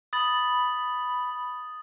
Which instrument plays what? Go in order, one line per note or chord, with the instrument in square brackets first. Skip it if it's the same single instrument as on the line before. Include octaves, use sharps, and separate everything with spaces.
[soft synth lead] B5 [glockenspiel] D#6 A6 F#7